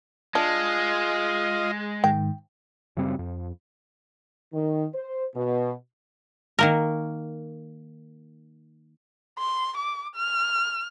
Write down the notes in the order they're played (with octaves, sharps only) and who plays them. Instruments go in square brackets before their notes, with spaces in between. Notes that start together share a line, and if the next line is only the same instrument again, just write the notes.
[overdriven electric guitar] G#3 [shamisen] D4 [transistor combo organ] F4 D#5
[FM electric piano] G#2 D#3 [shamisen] G5
[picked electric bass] F#2 C#3 G3 C4
F2
[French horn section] D#3
C5
B2
[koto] D#3 A#3 A#4
[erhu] C6
D6
F6